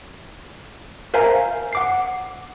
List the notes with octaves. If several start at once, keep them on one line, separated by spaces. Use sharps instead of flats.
A#4 C5 E5 F5 G#5 A#5
F#5 D6 C7